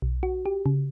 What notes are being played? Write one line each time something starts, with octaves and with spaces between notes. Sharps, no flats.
B1
F#4
G4
C#3